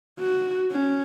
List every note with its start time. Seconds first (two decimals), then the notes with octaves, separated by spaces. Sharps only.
0.19 F#4
0.71 C#4